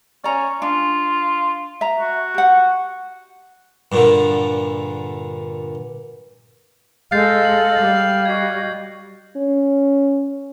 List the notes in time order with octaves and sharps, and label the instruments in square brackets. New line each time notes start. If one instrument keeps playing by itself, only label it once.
[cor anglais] C#4 [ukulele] D5 A#5
[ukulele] D4 [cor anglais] F4
[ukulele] E5 A#5
[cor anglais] F#4
[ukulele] G4 F#5
[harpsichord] G2 A#2 D3
[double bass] G#3 [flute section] A4 D#5 [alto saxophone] F5 [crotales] G6 A6 C7
[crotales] F#7
[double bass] G3
[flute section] F#4 D#5 [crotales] G#6 C7
[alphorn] C#4